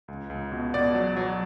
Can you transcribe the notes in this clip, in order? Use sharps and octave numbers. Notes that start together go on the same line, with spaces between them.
C#2
C#2
B2
B2 D5
F#3
F#3